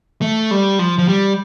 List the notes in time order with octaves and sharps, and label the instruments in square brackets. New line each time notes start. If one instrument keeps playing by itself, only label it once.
[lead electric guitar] A3
G3
F3
F3
G3